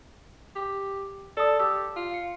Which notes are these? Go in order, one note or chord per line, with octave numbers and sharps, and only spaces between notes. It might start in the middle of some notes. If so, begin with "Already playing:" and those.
G4
A4 D5 A5 D#6
G4 E6
F4
C#7